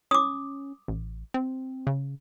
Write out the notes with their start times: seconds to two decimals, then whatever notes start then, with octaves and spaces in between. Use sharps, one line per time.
0.11 C#4 D6 D#6
0.88 A1
1.34 C4
1.87 C#3